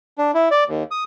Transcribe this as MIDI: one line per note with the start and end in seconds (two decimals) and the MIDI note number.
0.18 0.31 62
0.34 0.49 64
0.51 0.64 74
0.68 0.83 39
0.91 1.04 87